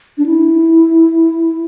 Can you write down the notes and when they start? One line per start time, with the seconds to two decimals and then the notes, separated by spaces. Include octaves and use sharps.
0.18 D4
0.26 E4